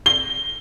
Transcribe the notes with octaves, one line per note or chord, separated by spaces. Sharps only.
G7